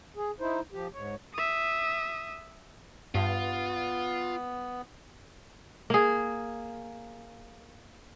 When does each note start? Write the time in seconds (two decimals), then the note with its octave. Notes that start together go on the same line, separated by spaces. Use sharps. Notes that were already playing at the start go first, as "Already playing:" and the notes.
0.16 G#4
0.40 D#4 E4 C5
0.73 F3 G4
0.94 G#2 C#5
1.33 E5 D#6
3.15 G2 B3 F4
5.90 A#3 G#4